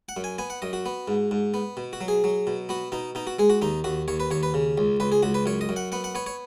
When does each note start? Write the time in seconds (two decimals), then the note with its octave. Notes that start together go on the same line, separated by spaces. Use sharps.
0.09 F#5
0.17 F#2
0.24 G#5
0.38 B3 G#5
0.50 F#5
0.62 F#2 D#5
0.73 F#4
0.86 B3
1.08 G#2
1.31 G#2
1.54 B3
1.77 B2
1.93 F#4
2.01 F#3
2.08 G#4
2.24 F#3
2.47 B2
2.69 B3 F#4
2.92 B2 D#4
3.15 B2 D#4
3.27 F#4
3.39 G#3 G#4
3.50 F#4
3.62 D#2 D#4
3.84 D#2 F#4
4.08 D#2 C#5
4.20 B4
4.31 D#2 C#5
4.43 B4
4.54 C#3
4.78 C#2
5.00 C#2 B4
5.12 G#4
5.23 C#2 F#4
5.34 B4
5.46 F#2 C#5
5.61 D#5
5.69 F#2
5.76 F#5
5.92 B3 F#5
6.04 F#5
6.15 B3 C#5
6.26 C#5